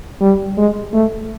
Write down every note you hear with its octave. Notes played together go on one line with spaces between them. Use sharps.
G3
G#3
A3